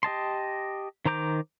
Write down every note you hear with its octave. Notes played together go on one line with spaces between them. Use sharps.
G4 D#5 A5 C6
D#3 C5 A#5 D6 G6